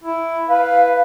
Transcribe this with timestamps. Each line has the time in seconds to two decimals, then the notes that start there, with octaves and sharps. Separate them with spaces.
0.04 E4
0.49 B4 F5